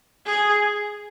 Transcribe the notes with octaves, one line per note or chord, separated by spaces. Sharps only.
G#4